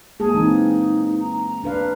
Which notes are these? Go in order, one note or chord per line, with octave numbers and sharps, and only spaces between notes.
G#3 A#3 G#4 A5
E3 A#3 C4 D#4
A#5
D4 B4 F5